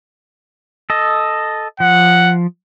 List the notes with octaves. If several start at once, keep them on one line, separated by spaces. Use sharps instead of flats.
A4 D#5
F3 F#5